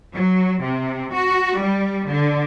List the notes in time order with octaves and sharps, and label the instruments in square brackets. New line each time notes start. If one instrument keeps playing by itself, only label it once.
[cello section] F#3
C3
F#4
G3
D3